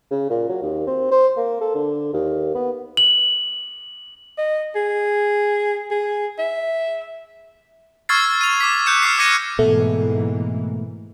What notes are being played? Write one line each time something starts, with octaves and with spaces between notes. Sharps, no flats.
C#3
A#2
F#3
D#2
C4
C5
A#3
A4
D3
D#2
B3
F#7
D#5
G#4
G#4
E5
C#6 E6 F6 G#6 A6 C7
D#7 F7
D6 B6
F#6 G6 C#7 E7
D6 F6 B6 C7
D6 E6 G#6 A#6 C#7 D#7
G#2 B2 E3 A3 A#3